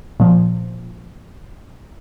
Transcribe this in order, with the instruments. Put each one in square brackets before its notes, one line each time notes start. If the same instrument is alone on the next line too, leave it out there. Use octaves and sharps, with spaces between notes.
[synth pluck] A#2 F3